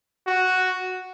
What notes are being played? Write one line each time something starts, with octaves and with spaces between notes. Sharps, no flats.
F#4